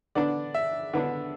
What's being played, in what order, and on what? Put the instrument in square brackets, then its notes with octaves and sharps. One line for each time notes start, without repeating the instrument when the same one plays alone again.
[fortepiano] D3 B3 D4 [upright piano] D5
[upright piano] E5
[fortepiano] D3 B3 D4